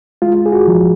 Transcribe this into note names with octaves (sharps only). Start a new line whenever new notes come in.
G#3 F4
G#4
F#4
F3